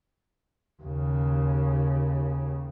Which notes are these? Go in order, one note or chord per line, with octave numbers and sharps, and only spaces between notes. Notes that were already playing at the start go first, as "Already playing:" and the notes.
D#2 C#3